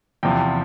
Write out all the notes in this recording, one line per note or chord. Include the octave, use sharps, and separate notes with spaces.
E2 C3 F3 G5